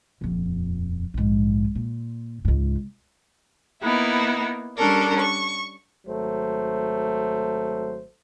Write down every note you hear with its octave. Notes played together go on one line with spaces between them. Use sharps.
D#1 F2
A#1 G#2
A#2
C#2 G#2
A#3 B3 D#4 E4
G3 C#4 D4 A4 A#4
C#6
G#1 F#3 A3 C5